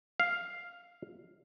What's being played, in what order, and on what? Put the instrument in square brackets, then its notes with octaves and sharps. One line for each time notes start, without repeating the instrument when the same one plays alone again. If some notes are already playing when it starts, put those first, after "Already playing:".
[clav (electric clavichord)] F5